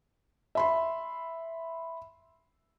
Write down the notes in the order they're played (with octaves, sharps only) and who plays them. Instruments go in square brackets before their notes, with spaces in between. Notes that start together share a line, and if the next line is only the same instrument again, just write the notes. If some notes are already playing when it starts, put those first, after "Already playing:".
[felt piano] E5 B5 C6